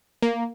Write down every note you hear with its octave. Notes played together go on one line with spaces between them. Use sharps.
A#3